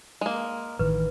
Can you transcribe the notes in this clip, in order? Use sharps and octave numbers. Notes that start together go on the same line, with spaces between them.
G#3 A#3
A1 D#3 E3 B4